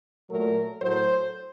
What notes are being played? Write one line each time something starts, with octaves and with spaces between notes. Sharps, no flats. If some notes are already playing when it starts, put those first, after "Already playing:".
A#2 F#3 A3 A#4
A2 F#3 A3 C5